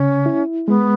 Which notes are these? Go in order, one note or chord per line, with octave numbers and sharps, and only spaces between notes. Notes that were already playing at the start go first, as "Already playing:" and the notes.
Already playing: C#3 C#4
E4
G#3 B3